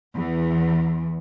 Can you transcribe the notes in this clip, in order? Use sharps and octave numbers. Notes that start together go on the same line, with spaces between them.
E2